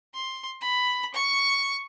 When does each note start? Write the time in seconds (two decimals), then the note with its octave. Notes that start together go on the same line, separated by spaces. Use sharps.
0.15 C6
0.61 B5
1.14 C#6